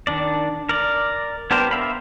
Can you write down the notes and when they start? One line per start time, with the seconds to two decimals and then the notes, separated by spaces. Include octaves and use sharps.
0.07 D#3 D4 D5
0.69 A#4 D5
1.51 B3 D4 G4 A#4 C5
1.71 A#4 E5 F5 B5